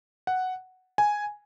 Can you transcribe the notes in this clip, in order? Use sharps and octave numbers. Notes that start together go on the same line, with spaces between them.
F#5
G#5